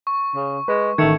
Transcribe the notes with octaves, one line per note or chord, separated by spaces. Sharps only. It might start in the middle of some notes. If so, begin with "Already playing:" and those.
C#6
C#3
G#3 B4
A1 D#3 A3 G#6 C#7